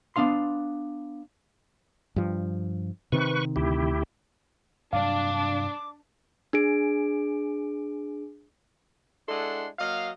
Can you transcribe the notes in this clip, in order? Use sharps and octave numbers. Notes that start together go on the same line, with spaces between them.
B3 D4 F5 C6
G2 F3
C3 D#3 C4 B4 C#6
D2 E4 G4
G2 C3 F#3 D4 F5 D6
D4 G#4 D7
G#3 D4 E4 A4 F#5 C6
F#3 A#3 D#5 F5